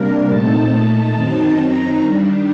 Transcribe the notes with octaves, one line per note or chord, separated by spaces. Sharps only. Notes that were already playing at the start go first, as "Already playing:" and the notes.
Already playing: C3 G3 A#3 D4 A#4
A#2 A3 C4 D#4 A5
A#2 A3 D#4
F#2 D#3 F#3 C4 D#4 A5
F#2 D#3 F#3 C4 D#4 A#5
D#3 G3 D4